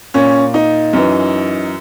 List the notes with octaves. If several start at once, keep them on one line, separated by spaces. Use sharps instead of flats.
A#2 C#4
D#4
F#2 E3